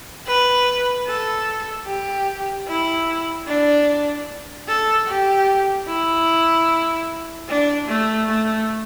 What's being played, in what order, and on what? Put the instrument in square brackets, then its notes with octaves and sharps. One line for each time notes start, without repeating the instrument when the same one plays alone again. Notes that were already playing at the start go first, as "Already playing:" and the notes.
[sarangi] B4
A4
G4
E4
D4
A4
G4
E4
D4
A3
A3